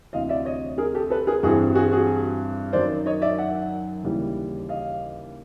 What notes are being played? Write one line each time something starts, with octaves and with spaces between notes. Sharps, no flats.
D2 C3 E3 D#5 F5
D5 E5
C#5 D#5
G#4 A#4
G4 A4
A4 B4
G#4 A#4
G2 E3 G3 C4 F#4 G#4
F#4 G#4
F#4 G#4
F#2 D#3 F#3 C5 D5
C#5 D#5
D5 E5
E5 F#5
D#2 C#3 E3 G3
D#5 F5